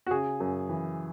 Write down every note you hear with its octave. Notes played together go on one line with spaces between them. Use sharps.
F#4
C#3 G#4
F#2
E3